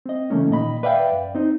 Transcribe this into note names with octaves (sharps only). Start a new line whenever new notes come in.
C4 D#5
C#3 E3 A3 A#3 C#4
A#2 D#3 D#5 B5
B4 D5 E5 F5 G5
F#2
C4 D#4